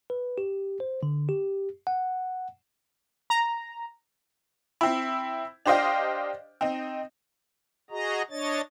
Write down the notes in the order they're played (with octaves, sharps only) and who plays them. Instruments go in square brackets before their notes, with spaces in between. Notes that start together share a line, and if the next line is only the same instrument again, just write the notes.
[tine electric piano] B4
G4
C5
D3
G4
F#5
[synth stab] A#5
[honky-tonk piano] C4 E4
D4 G4 C5 D#5 F5 G5
C4 D#4
[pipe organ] F#4 G#4 D#5 A#5
D4 C#5 D#5 A6